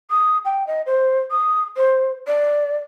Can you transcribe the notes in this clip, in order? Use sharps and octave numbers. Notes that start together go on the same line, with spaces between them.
D#6
G5
D#5
C5
D#6
C5
D5